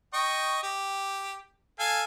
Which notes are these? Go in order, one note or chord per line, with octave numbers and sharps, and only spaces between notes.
D#5 G5 C#6
G4
A4 F5 G#5